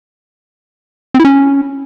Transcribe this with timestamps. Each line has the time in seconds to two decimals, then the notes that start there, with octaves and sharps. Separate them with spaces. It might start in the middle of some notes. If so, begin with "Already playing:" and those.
1.14 C4
1.19 E4
1.25 C#4